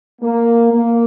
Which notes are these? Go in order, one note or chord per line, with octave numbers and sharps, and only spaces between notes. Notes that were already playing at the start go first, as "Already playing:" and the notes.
A#3
A#3